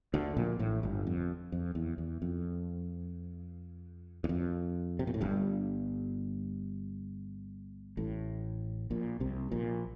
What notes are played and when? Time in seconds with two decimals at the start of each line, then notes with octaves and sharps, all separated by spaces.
0.14 D2 D3
0.37 A#1 A#2
0.59 A1 A2
0.83 G1 G2
1.07 F2
1.52 F2
1.75 E2
1.98 E2
2.22 F2
4.24 E2
4.29 F2
4.99 C3
5.07 A#2
5.14 A2
5.21 G1 G2
7.97 A1 A2
8.90 A#1 A#2
9.20 C2 C3
9.52 A#1 A#2